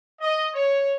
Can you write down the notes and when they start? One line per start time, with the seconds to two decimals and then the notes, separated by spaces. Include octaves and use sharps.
0.20 D#5
0.54 C#5